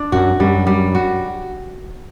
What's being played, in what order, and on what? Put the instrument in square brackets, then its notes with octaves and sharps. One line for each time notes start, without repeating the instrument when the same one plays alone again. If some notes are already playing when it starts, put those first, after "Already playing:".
Already playing: [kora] D4
[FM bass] F#2 [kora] F#4
[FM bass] F#2 [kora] G3
[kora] G3
F#4